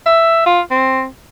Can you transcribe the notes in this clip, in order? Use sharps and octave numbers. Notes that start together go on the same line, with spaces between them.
E5
F4
C4